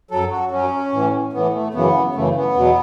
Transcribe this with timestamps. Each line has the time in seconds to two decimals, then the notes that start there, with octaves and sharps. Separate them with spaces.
0.11 F#2 F#3 A4
0.31 F#4
0.51 F#2 F#3 C#4
0.93 A2 E3
1.33 A2 E3 B3
1.54 A3
1.73 F#2 C#3 E3 B3
2.14 F#2 C#3 E3 A3
2.35 B3
2.56 E2 B2 F#3